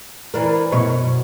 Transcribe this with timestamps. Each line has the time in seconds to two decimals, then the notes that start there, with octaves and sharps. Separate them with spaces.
0.34 E3 D4 A#4
0.72 F#2 B2 C#5